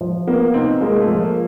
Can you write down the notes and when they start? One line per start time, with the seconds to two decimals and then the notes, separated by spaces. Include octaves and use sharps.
0.01 F3
0.27 A#3 B3
0.54 C3 C4 D#4
0.81 G#3 A#3
1.01 A3
1.07 F3
1.20 A#3